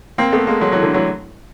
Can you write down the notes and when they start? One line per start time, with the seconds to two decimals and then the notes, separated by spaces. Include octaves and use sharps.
0.18 A#3 C4
0.33 A3 B3
0.47 G#3 A#3
0.61 F#3 G#3
0.72 E3 F#3
0.83 D3 E3
0.94 E3 F#3